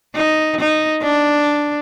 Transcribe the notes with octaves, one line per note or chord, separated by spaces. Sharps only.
D#4
D#4
D4